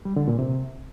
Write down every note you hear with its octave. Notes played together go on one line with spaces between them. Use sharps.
G3
D3
A#2
C3